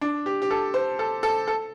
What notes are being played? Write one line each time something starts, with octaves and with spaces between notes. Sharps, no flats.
D4
G4
G4
A4
C5
A4
A4
A4